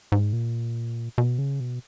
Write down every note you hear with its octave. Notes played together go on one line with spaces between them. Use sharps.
G#2
A#2
B2
C#3
B2